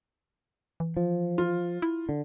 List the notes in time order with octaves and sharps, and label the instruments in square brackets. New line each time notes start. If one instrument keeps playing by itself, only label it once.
[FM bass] E3
[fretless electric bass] F3
[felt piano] F4
[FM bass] E4
[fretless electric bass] D3